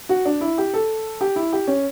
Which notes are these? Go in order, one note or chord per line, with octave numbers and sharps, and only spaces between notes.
F#4
D4
E4
G4
A4
G4
E4
G4
C#4